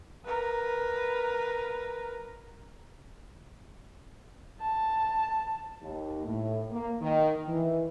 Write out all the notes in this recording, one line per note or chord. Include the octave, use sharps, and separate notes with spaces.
A#4 B4
A5
D#2
A2
A#3
D#3
E3